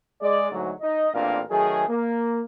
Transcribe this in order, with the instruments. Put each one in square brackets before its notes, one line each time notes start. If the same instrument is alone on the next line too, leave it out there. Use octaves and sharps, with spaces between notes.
[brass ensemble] G#3 D5
D2 G#2 F#3
D#4 D#5
A1 A#2 C4 D4 A#4 F5
D#3 F#3 A3 G#4
A#3